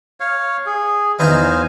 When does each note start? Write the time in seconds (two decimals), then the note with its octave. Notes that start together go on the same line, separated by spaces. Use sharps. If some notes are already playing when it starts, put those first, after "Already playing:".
0.20 C#5 F5
0.66 G#4
1.19 E2 F#3 D#4 C5 F5 G#5